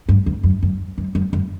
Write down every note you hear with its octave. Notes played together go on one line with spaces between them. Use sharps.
G2
E2
F#2
F#2
F#2
F#2
F#2